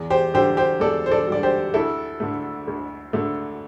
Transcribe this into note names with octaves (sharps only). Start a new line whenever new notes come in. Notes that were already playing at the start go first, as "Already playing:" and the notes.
Already playing: E2
G4 C5
D3 G3 G4 C5
G4 C5
E2 A4 D5
C5
A4 D5
D3 G3 D5
G4 C5
D2 E4 A4
D3 A3
D2
D3 A3